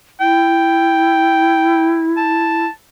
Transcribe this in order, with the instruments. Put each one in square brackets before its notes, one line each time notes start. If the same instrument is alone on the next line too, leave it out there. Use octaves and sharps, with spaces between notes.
[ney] E4 [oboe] G5
[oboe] A5